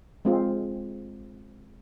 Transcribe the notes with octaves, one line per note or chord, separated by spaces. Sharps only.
G#3 C4 F4